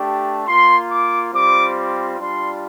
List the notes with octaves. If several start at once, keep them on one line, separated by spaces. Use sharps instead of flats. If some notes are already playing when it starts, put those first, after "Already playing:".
Already playing: A3 D4 G4
A#3 F4 C6
D6
G3 C4 F4 D6
D6
G3 D4 F4 C6